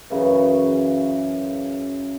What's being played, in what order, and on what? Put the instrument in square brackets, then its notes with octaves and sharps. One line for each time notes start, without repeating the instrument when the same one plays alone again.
[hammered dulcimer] F#2 C#3 E3